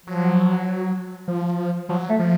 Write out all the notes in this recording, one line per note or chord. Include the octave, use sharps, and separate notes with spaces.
F3 F#3
F3
F3 F#3
A3
F3